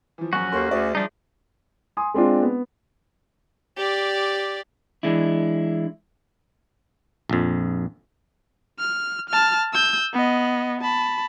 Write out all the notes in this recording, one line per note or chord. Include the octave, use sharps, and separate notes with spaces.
E3 F3
A#1 F#2 C#4 F#4
D#2 A4 A#4 C6
D2 G#4 D5 E5
F3 G3 D4 D#4
G#5 C6 D#6
G#3 C4 D4 F4
B3
G4 D5
E3 G#3 D4 E4
A#1 F2
F6
A5 F6
E6 G6
B3 D#5
A5 B5